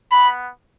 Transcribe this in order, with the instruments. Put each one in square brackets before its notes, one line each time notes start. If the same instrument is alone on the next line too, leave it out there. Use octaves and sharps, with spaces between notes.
[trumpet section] B3 B5